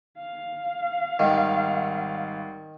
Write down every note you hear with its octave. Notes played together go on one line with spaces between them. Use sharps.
F5
G#1 D#3 G3 F#5